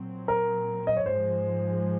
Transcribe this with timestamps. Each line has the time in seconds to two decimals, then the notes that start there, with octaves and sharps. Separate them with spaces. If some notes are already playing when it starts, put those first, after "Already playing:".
Already playing: A#2 F#3 C4
0.28 A#4
0.87 D#5
0.97 C#5
1.06 G#2 F3 G#3 C5